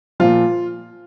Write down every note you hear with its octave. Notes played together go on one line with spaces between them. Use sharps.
A#2 F3 F4